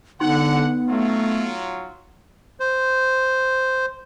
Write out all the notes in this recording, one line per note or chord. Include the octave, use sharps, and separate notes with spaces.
D3 B3 D#4 F#5 C6
F#3 A3 F4
C5